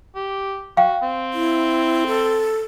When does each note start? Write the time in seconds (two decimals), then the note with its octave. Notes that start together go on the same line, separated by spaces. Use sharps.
0.15 G4
0.77 F#4 F5 G5
1.02 C4
1.33 E4
2.07 A4